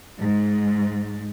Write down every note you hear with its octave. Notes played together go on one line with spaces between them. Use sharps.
G#2